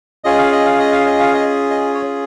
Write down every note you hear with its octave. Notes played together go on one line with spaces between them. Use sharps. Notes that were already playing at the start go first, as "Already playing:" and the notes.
C#4 F4 G#4 D#5
F5
D#5
F5
D#5
F5
D#5
F5
D#5
D#5
C#5